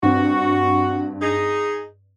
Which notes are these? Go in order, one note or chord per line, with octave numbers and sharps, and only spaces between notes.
G2 C4 F#4
D#4 G#4